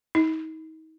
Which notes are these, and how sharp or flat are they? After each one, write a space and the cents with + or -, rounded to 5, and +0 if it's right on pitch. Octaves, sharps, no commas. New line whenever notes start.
D#4 +35